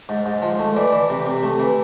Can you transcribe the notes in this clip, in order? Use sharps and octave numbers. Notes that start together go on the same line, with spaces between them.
G#2
G#2
F3
A3
E3 D5
E3
C3
C3
A3
E3